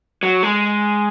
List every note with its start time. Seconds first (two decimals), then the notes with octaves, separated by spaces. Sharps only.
0.23 F#3
0.43 G#3